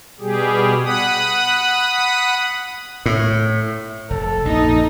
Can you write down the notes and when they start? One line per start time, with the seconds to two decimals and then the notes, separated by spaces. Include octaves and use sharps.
0.20 B2 G3 G4 G#4
0.84 F#5 B5 D#6
3.06 A2
4.10 F1 A4
4.45 A#1 F#2 A#2 D#4